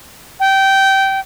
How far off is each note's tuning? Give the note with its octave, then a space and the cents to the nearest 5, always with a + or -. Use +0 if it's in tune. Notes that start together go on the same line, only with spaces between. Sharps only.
G5 -20